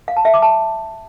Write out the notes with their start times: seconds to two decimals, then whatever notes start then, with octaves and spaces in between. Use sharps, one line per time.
0.08 F5
0.16 A5
0.25 E5
0.34 D6
0.42 A5